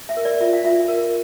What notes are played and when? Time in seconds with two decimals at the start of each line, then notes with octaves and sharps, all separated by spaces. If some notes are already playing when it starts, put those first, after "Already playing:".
0.09 E5
0.17 A#4
0.25 D5
0.41 F4 E5
0.53 F5
0.65 F4 E5
0.88 A#4